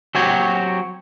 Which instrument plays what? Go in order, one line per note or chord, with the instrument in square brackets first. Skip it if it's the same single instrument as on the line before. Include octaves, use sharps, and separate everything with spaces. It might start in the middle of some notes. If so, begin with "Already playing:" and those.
[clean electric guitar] F#3 C4 F#4 G4 C#5